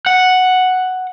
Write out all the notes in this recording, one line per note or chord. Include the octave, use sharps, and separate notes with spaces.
F#5